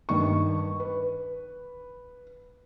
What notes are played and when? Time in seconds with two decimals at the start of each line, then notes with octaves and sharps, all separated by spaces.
0.09 G2 D#3 C#6
0.80 B4